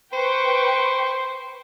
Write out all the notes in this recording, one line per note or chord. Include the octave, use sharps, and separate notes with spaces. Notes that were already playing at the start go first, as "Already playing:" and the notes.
B4 C5 G5 C#6